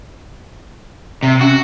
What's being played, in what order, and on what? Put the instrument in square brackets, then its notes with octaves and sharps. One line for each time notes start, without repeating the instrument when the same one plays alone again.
[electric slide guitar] C3
[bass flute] C#4 [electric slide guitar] F#4